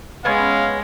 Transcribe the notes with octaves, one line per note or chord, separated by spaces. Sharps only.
G#3 B3 C#4 F5